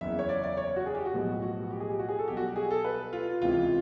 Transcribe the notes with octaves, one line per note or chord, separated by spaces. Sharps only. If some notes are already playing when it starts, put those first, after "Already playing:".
F#1 E2 C#3 E3 E5
C#5
D5
D5
C#5
F#4
G#4
G4
F#4
B1 A2 F3 G#3 B3
F#4
G4
G#4
G4
F#4
G#4
A4
B1 B2 G3 G4
F#4
G4
G#4
A4
B4
F4
F4
C#2 C3 E3 F4